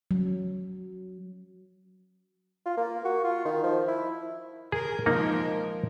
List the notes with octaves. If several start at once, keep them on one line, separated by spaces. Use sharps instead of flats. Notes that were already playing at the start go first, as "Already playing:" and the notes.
F#3
F4
A#3
F#4
F4
D#3
F3
E4
G#4 A#4
F3 G#3 A#3 D#4 A#4